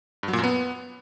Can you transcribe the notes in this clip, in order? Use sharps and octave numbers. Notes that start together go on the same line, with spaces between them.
G2
F#3
A#2
F#2
B3